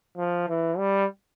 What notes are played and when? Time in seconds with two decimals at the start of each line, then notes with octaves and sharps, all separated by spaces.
0.18 F3
0.48 E3
0.78 G3